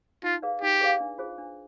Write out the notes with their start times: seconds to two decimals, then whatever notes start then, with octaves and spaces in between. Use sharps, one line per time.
0.23 D#4 F4
0.42 G#4 B4 D5 F5
0.62 D#4 G4
0.80 G#4 B4 D5 F5
1.00 D4
1.18 F4 G#4 C5
1.38 D4